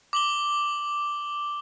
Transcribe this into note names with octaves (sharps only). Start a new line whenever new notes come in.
D6 F#7 G7